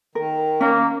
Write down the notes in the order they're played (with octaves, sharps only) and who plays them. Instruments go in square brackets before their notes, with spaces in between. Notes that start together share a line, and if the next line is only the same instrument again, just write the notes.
[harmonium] D#3 [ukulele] A#4
[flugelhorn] A#3 [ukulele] C#4